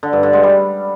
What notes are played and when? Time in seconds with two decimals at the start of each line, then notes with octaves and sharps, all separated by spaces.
0.03 D3
0.13 G2
0.23 D3
0.33 G#3
0.43 G3